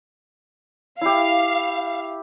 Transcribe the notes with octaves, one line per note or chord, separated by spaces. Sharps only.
E4 G4 F5